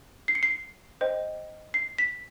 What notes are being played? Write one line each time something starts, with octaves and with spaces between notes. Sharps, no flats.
C7
C#7
C7
C5 D#5 G5
C7
B6